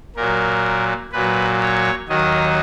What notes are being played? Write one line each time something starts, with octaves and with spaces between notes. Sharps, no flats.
A#2 F#3 A#4
A#2 F#3 B4
C#5
D#2 D#3 F#3 D#5